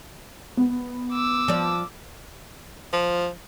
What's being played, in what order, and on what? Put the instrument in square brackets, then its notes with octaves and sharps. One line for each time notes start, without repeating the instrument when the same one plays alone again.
[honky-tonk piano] B3
[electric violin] D6 E6
[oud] F3 D5
[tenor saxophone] F3